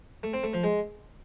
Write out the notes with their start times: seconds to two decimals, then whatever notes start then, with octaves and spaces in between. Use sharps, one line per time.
0.23 A3
0.33 C4
0.44 A3
0.54 F3
0.64 G#3